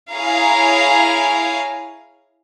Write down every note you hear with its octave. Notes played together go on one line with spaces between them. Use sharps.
E4 G#4 C#5 F5 G#5 A#5